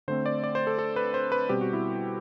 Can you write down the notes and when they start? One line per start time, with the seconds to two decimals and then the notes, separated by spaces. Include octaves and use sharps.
0.08 D3 A3 C4 C5
0.26 D5
0.44 D5
0.55 C5
0.67 A4
0.79 A4
0.96 B4
1.14 C5
1.32 B4
1.49 B2 G3 C4 G4
1.61 F#4
1.73 E4